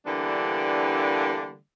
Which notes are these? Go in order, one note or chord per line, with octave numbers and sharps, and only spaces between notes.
D3 E3 G3 A#3 B3 D4